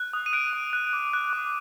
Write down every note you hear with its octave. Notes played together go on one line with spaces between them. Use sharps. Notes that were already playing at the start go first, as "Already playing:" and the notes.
Already playing: F#6
D#6
D#7
F#6 D7
D#6
F#6
D6
F#6
D6